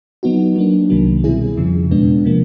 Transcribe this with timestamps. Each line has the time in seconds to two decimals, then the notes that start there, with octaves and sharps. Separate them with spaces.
0.23 F#3 B3 D#4 F#4
0.56 F#3 A#3 D4
0.90 C2 C3 D#3 F#3 A#3
1.24 B2 G3 C4 E4 G#4
1.57 F2 C#3 F3
1.91 E2 B2 G#3 B3 D4
2.25 C3 F3 A#3